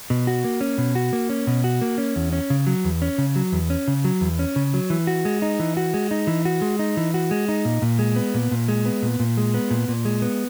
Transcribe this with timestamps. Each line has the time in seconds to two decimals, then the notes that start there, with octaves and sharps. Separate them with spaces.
0.10 B2
0.27 F#4
0.44 A#3
0.61 C#4
0.78 B2
0.95 F#4
1.13 A#3
1.29 C#4
1.47 B2
1.64 F#4
1.82 A#3
1.98 C#4
2.16 E2
2.33 C#4
2.50 C#3
2.67 F#3
2.85 E2
3.02 C#4
3.18 C#3
3.36 F#3
3.52 E2
3.70 C#4
3.88 C#3
4.04 F#3
4.21 E2
4.39 C#4
4.56 C#3
4.74 F#3
4.90 E3
5.07 F#4
5.25 G#3
5.42 D#4
5.60 E3
5.77 F#4
5.94 G#3
6.11 D#4
6.27 E3
6.45 F#4
6.61 G#3
6.79 D#4
6.97 E3
7.14 F#4
7.31 G#3
7.49 D#4
7.65 A#2
7.82 A#2
7.99 G#3
8.16 B3
8.34 A#2
8.51 A#2
8.68 G#3
8.85 B3
9.02 A#2
9.20 A#2
9.37 G#3
9.54 B3
9.71 A#2
9.88 A#2
10.05 G#3
10.22 B3